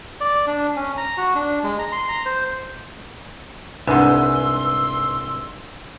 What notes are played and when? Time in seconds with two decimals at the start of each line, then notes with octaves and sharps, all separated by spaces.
0.21 D5
0.47 D4
0.76 C#4
0.97 A#5
1.17 F#4
1.35 D4
1.64 G#3
1.79 A#5
1.92 C6
2.09 A#5
2.26 C5
3.87 C2 G#2 D4 B4 F#5 G#5 C6 E6